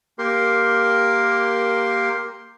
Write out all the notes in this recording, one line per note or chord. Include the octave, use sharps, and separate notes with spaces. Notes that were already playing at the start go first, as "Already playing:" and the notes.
A#3 G4 A#4 C6